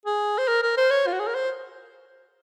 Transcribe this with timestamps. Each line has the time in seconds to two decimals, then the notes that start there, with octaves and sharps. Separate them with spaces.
0.06 G#4
0.38 C5
0.48 A#4
0.63 A#4
0.78 C5
0.91 C#5
1.07 F4
1.13 F#4
1.20 G#4
1.27 A#4
1.35 C5